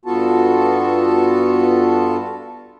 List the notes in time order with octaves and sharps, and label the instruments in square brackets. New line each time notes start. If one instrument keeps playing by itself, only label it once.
[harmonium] G2 B3 F4 F#4 A4 A5